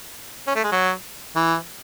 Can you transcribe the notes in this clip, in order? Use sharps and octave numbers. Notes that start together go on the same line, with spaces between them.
C#4
A3
G#3
F#3
E3